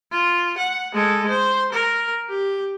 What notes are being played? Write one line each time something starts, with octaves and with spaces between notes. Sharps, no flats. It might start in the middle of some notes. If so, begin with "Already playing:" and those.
F4
F#5
G#3 A4
C5
A#4
G4